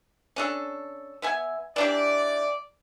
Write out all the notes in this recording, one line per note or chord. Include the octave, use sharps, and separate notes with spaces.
C#4 D4 A4
B3 E5 G#5
E3 D4 G4 D5